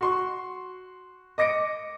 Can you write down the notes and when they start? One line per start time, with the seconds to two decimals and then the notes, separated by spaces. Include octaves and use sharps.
0.01 F#4 C6 C#6
1.38 D#5 D6 A#6 C#7 D7